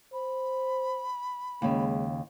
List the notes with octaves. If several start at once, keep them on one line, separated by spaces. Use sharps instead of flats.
C5 B5
D#2 C#3 G#3